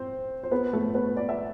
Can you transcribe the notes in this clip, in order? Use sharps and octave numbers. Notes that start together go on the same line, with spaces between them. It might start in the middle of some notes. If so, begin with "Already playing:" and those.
Already playing: C4 C5
C5
B3 B4
A3 A4
B3 B4
D5
E5